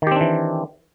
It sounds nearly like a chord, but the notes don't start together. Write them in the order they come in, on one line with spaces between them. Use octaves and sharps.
D#3 G4 C4 D4 E3